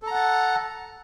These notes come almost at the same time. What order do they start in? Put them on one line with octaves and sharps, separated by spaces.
A4 A#5 F#5 A5